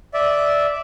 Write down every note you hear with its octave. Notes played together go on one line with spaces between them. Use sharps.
D5 E5